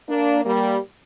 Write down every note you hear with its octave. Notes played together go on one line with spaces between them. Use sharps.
A#3 D4
G3 A#3